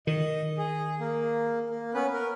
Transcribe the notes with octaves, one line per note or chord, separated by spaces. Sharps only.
D#3 D#5
G#4
A#3
A#3
B3 C#4 B4
A#4